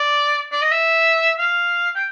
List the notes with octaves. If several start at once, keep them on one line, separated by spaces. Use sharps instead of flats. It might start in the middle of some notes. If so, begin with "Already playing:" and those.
Already playing: D5
D5
D#5
E5
F5
G5